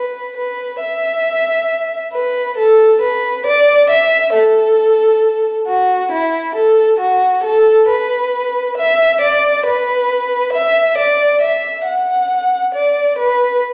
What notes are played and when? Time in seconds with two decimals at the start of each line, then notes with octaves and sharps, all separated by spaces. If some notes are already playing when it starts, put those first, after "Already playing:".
Already playing: B4
0.37 B4
0.81 E5
2.13 B4
2.58 A4
3.01 B4
3.46 D5
3.90 E5
4.34 A4
5.66 F#4
6.12 E4
6.55 A4
7.00 F#4
7.44 A4
7.88 B4
8.77 E5
9.21 D5
9.66 B4
10.53 E5
10.98 D5
11.42 E5
11.86 F#5
12.74 D5
13.19 B4